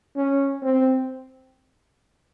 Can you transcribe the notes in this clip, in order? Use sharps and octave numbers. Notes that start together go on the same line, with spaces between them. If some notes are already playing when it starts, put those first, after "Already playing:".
C#4
C4